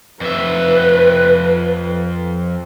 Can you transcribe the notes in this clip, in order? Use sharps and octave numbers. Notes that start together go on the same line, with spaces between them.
F2 B4 E5